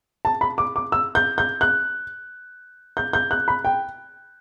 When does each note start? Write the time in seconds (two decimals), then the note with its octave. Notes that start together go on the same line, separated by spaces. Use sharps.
0.25 A5
0.41 B5
0.58 D6
0.76 D6
0.92 E6
1.15 G6
1.38 G6
1.61 F#6
2.97 G6
3.13 G6
3.31 F#6
3.48 B5
3.65 G5